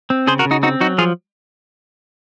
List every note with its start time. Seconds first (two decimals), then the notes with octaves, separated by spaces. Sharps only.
0.10 C4
0.27 C#3 G#4 C5
0.39 F#4 A#4
0.45 C#3
0.51 D#4 F#4
0.63 C4 D#4 F#4
0.81 F#3 D#4 F#4
0.98 F3 F4 G#4